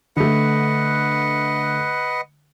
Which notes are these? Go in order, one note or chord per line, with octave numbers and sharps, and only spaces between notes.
D3 A3 B4 D#5 F#5